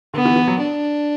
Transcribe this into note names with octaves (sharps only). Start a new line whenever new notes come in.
D3 B3
E3
E3
F#3
D4